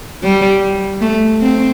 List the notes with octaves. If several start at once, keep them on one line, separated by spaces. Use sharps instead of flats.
G3
A3
C4